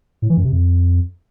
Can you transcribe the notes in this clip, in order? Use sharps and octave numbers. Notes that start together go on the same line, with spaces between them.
A2
E3
F#2
C3
F2